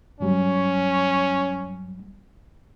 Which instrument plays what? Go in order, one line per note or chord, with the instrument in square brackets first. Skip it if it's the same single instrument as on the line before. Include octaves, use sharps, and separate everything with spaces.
[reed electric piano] G2 F#3 G3 [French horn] C#4